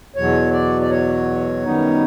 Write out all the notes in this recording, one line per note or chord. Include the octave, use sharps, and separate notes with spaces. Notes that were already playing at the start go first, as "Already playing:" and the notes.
E2 B2 F#3 C#5
D5
D5
C#5
F#2 D#3 G3 B3 D#4